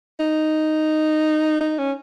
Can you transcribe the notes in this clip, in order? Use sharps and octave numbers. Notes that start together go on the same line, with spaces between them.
D#4
D#4
C#4